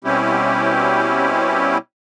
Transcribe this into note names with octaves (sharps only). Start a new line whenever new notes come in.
B2 G3 C4 C#4 E4 G4